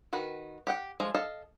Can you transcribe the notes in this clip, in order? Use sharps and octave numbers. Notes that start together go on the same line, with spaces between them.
D#3 F#4 B4
G4 F#5 G5
F3 G#3 A3
A4 D#5 F5 A5